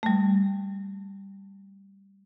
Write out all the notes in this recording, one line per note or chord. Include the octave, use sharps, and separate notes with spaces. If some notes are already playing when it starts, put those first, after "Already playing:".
G3 A3